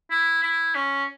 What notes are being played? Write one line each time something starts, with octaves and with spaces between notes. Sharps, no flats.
E4
E4
C#4